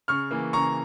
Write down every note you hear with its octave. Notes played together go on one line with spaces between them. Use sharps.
C#3 C#6 F6
E3 A#3
C#3 A#5 C#6